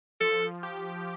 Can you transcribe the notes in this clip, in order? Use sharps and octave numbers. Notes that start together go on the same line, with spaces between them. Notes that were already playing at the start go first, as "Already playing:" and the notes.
F3 A4
G4